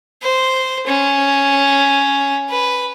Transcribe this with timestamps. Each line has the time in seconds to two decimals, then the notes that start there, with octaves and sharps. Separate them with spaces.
0.22 C5
0.87 C#4
2.50 B4